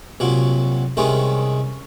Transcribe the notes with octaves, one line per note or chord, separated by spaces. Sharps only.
C2 A#2 F#3
C2 C3 D#3 G#3 C#4